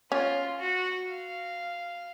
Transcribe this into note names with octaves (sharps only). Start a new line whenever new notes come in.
C#4 F4
F#4
F5